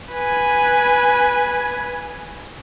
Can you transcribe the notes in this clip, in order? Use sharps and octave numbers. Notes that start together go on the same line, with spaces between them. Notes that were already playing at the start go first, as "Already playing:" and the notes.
B4 G#5